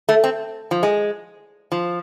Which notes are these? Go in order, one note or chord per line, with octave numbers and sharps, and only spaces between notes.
A3
C4
F3
G#3
F3